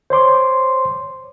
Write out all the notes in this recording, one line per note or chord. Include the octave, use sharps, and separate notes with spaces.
C5 C#5 C6 D6